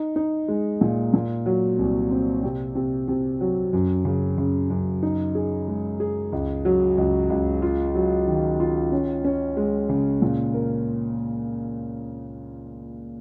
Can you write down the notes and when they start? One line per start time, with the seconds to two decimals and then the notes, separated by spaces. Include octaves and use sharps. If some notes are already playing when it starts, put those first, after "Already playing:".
Already playing: D#4
0.16 D#4
0.48 G#3
0.81 A#2
1.14 A#2
1.46 F#3
1.79 C2
2.11 C4
2.43 C3
2.75 C3
3.08 C3
3.41 F#3
3.73 F#2
4.05 C#3
4.38 C#3
4.70 F#2
5.03 D#4
5.35 G#4
5.68 G#3
6.00 G#4
6.32 C#2
6.65 F#3
6.98 C#2
7.30 C#2
7.62 F4
7.95 F#3
8.27 D#3
8.60 F4
8.92 C#4
9.24 C#4
9.57 G#3
9.89 C#3
10.22 A#2
10.54 A#4